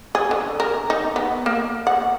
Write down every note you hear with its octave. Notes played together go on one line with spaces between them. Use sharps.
G#4
D3
A#4
D#4
B3
A#3
F#5